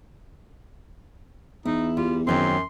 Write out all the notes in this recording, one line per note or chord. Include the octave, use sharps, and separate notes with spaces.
E2 D#4 E4
G3 F4
F#2 D#3 F#3 C4 C6